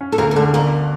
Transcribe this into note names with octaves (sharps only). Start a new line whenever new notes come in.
C#4
A4
D2 A#3 A#4
A#4
D3 A3 A4
G1 A#3 A#4